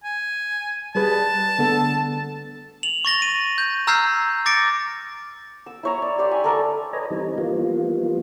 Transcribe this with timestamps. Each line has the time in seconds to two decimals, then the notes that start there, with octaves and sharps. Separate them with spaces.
0.04 G#5
0.95 G3 G#4 B4 A5
1.58 D3 B3 A4
2.83 F7 F#7
3.05 C#6 A6 A#6 G7
3.22 D#7
3.58 G6
3.87 A#5 E6 F6 G6 G#6 C7
4.46 D6 A6 A#6 C#7 D7
5.66 E6
5.83 E4 C#5 A#5
6.02 D5
6.18 G4 D5 C6
6.31 E5 G#5 B5
6.44 A4 A#4 D5 C#6
6.93 A4 B4 C#5 D#5 G#5 A#5
7.10 E3 G3 C4 D#4
7.38 E3 F3 G3 A#3 B3 F4